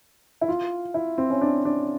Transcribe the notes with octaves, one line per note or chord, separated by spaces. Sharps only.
E4
F4
E4
C4
C#4
D4
D4